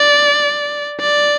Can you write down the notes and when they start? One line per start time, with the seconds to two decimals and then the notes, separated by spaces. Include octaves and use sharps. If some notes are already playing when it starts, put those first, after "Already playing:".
Already playing: D5
1.00 D5